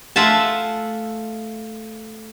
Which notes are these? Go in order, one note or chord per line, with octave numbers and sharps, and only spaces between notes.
A3 F4 E5 F#5 G#5 A5